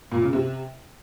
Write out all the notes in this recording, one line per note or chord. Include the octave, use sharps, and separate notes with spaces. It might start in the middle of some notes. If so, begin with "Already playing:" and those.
A#2
C#3
C3